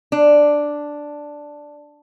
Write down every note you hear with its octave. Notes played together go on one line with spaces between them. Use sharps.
D4